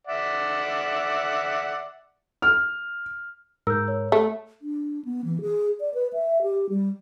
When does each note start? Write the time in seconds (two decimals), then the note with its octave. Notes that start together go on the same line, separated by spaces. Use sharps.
0.07 D5 E5 F#5
2.42 F6
3.67 G#2 A#4 E6 G6
3.88 C#5
4.12 A3
4.62 D4
5.05 B3
5.24 E3
5.41 G#4
5.80 D5
5.94 B4
6.13 E5
6.42 G4
6.69 G3